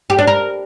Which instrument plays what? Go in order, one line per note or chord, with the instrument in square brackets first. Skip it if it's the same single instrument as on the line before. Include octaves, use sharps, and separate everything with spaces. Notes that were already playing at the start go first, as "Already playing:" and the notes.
[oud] G4
D4
A#4